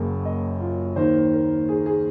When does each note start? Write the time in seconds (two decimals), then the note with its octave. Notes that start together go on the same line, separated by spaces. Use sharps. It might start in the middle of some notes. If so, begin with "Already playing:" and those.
Already playing: F#1 F#2 C#3 F#3 A#3
0.25 D#5
0.60 F4
0.96 D#2 D#3 A#3 D#4 C5
1.33 A#4
1.69 G#4
1.86 G#4